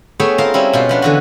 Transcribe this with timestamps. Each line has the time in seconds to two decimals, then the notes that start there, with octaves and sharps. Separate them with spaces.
0.20 A3 B3 G#4 C#5 E5 G5
0.38 C4 F4 A#4 F5
0.54 G3 C4 C#4 E4
0.73 B2 F4 G5
0.89 F3 B3 D4
1.02 D3 E3 F#4